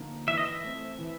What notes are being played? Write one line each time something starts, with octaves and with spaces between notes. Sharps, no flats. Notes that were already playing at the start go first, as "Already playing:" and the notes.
Already playing: D3 F3 A#3 D#4
E3 E5
D#5
E5
A3 C4
E3